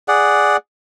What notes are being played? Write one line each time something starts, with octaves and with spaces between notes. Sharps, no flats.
G#4 D5 F#5